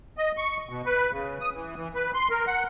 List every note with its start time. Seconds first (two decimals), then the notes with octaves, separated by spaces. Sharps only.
0.18 D#5
0.37 C#6
0.69 B2
0.86 B4
1.11 C#3
1.41 D#6
1.54 E3
1.76 E3
1.95 B4
2.14 C6
2.30 A#4
2.47 F#5